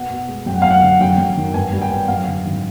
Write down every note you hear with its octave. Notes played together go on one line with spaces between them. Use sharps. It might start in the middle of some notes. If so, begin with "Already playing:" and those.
Already playing: B2 F#5
B2
G#3
F#2 G5
F#5
F#2 F5
F#5
D3
F#2 G5
F#2
D#3
G2 G#5
G3
G5
G2
F#2 F5
D3
G#1